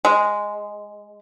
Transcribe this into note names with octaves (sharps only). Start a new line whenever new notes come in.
G#3